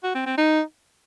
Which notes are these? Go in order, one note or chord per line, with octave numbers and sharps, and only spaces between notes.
F#4
C4
C4
D#4